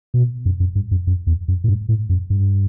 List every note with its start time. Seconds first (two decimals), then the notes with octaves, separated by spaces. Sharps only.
0.14 B2
0.45 F#2
0.60 F#2
0.75 G2
0.91 F#2
1.07 F#2
1.27 E2
1.48 F#2
1.64 A2
1.68 G2
1.89 A2
2.09 F#2
2.30 G2